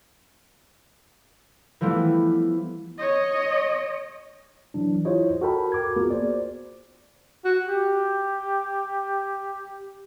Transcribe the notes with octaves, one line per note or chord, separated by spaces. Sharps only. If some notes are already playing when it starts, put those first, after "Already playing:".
E3 F3 G3 A3 B3
C#5 D#5
E3 F#3 D4
E4 F4 G4 C5 C#5 D#5
F#4 A4 A#4 G5 A5 B5
A#4 D6 G#6
A#3 B3 F4 F#4 G#4 A#4
C5 D5
F#4
G4